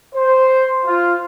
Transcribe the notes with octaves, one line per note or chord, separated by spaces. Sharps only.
C5
F4